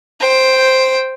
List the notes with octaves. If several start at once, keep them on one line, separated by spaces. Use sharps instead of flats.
C5 G5